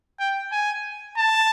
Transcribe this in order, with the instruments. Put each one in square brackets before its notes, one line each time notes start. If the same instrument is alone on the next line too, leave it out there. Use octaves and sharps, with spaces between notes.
[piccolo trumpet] G5
G#5
A5